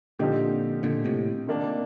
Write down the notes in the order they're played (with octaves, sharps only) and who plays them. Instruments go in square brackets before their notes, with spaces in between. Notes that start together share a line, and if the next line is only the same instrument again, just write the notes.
[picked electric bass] A#2 D3 [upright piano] F3 C4 D#4 G4
[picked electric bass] A#2 D3
A2 C3
[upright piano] C3 D#3 A#3 D4